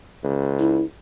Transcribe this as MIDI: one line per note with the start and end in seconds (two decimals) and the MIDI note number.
0.23 0.82 37
0.59 0.83 64